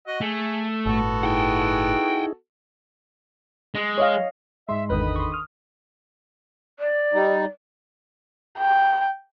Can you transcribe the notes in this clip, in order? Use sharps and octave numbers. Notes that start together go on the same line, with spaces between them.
F#4 D#5 F#5
A3 G#4
G1 A2 B3 F#4 A4
D#4 E4 G#4 F#5 G5
G#3
C#5 D#5 F5
G#2 G#3 E5 C6
G#1 E2 D3 D#3 B4 D#5 B5 D#6
C6 C#6
D#6 F6
D5
G3 D#4
G5